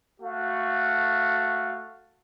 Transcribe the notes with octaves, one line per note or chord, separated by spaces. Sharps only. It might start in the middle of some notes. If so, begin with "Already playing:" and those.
A3 F#4 F5